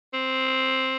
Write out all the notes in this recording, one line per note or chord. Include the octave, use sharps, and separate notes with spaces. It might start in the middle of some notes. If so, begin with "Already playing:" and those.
C4